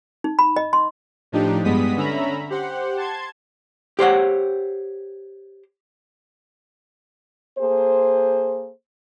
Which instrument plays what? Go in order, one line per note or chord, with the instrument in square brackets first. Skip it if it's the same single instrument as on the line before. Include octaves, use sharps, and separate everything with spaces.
[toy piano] D#4
B5
D#5
C6
[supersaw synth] A2 F3 D4 D#4 G4
G2 G3 G#3 B3 D#6 B6
D3 C#4 E5 A#5 B5
G4 C5 F#5
A5 C6 G#6
[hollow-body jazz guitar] G4 C5 C#5 F#5
[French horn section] A#3 G#4 A4 C5